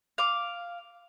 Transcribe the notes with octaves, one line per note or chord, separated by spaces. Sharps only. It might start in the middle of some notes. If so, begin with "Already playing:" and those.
F5 D6